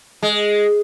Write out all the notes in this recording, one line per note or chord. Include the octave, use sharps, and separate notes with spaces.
G#3